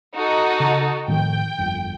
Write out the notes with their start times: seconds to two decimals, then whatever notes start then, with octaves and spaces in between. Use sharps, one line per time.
0.14 D#4 F#4 A4
0.60 C#3
1.08 A2 D#3 F3 G5
1.58 G1 F2